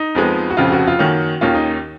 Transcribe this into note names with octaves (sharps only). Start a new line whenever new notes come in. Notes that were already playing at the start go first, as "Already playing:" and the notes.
Already playing: D#4
F2 F3 G#3 B3
F#4
F1 F2 C#3 F3 F4
F#4
F4
F#2 D#3 A#3 C#4 F#4
D#2 D#3 A#3 C#4 F4
D#4